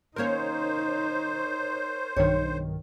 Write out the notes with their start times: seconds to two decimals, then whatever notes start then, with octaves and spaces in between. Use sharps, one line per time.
0.16 D#3 A#3 C#4 D#4 A#4 C5 C#5
2.17 B1 G2 D#3 C#5